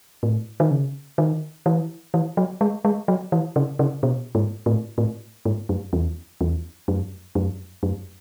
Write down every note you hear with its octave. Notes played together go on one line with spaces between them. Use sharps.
A2
D#3
C#3
D#3
E3
E3
F#3
G#3
G#3
F#3
E3
C#3
C#3
B2
G#2
A2
A2
G#2
F#2
E2
E2
F#2
F#2
F#2